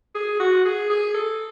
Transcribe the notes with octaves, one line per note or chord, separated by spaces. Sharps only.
G#4
F#4
G#4
G#4
A4